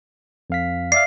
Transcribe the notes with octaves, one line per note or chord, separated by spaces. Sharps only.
F2 F5 B6
D5 E5 F5 C7